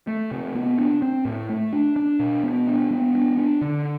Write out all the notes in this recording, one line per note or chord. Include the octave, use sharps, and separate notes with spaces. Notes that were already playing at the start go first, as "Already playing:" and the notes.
A3
C3
B3
D4
C4
A2
A3
D4
D4
B2
B3
D4
B3
D4
D4
D3